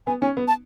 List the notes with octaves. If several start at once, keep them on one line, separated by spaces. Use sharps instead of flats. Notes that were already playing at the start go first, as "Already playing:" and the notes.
B3 G#5
C#4 G#5
B3
A5